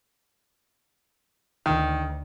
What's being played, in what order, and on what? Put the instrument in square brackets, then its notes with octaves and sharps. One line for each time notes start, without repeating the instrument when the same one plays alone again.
[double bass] D2 [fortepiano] D#3